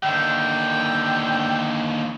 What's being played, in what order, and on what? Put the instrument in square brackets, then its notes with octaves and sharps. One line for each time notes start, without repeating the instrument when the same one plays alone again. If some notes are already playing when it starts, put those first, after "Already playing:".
[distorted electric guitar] D#2 D3 [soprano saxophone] G5